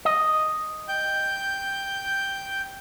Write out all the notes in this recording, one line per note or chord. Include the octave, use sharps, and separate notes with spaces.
D#5
G5 G6